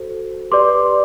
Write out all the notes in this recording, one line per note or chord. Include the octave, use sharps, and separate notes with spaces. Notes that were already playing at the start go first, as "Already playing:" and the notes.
Already playing: F#4 A4 C5
G4 B4 D5 C6 D6